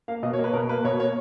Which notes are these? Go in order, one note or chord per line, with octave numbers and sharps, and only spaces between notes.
A#3 F5
B2 D#5
C#5
A#3
B4
B2 A#4
A#3 B4
B2 C#5
A#3 C#5